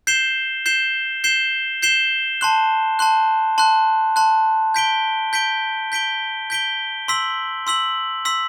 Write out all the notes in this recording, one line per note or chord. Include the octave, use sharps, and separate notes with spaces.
G6 C7 E7 G7
G6 C7 E7 G7
G6 C7 E7 G7
G6 C7 E7 G7
A5 C6 F#6
A5 C6 F#6
A5 C6 F#6
A5 C6 F#6
G6 B6 D7 G7
G6 B6 D7 G7
G6 B6 D7 G7
G6 B6 D7 G7
C6 E6 B6 F#7
C6 E6 B6 F#7
C6 E6 B6 F#7